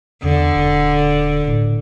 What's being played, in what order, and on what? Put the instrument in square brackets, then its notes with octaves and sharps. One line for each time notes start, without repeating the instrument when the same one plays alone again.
[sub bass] E2 [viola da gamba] D3
[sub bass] D#1
A2